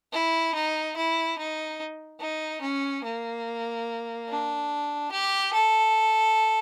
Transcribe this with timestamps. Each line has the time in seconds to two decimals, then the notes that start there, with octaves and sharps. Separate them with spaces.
0.13 E4
0.55 D#4
0.96 E4
1.38 D#4
2.20 D#4
2.61 C#4
3.04 A#3
4.29 D4
5.12 G4
5.53 A4